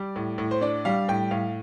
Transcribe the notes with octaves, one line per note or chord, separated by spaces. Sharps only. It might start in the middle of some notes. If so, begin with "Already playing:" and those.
Already playing: G3 D5
A2
A2
C5
D4 D5
G3 F5
A2 G5
A2 F5